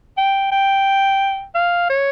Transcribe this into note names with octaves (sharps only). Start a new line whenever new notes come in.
G5
G5
F5
C#5